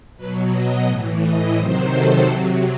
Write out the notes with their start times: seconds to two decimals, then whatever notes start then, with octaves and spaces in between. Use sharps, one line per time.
0.17 B2 F#3 B4
0.52 D#5
0.87 A2 E3
1.21 D#5
1.56 C3 D#3 F#3 C5
1.90 A4
2.25 C3 F#3